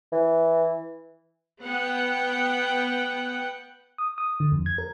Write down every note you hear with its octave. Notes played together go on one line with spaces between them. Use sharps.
E3
B3 F#5 G5
D#6
D#6
D3
F2
G#6
A#4